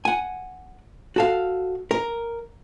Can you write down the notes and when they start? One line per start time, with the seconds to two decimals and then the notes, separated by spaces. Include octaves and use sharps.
0.05 F#5 G#5
1.16 F#4 A4 F5
1.91 A#4